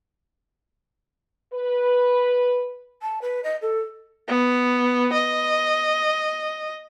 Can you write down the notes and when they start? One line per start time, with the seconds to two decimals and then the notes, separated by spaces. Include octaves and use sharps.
1.52 B4
3.02 A5
3.22 B4
3.44 D#5
3.62 A4
4.28 B3
5.13 D#5